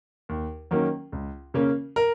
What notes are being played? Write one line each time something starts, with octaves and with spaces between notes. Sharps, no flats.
D#2
D#3 F#3 A#3 C#4
C#2
C#3 A#3 C#4
A#4